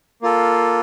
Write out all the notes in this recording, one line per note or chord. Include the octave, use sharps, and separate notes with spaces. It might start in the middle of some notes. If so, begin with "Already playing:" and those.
A#3 F4 A4